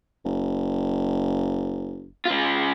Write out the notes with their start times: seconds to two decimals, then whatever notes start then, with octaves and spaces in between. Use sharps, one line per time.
0.25 F#1
2.25 C#3 F4